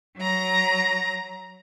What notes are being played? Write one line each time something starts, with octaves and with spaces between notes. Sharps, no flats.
F#3 A#5 A#6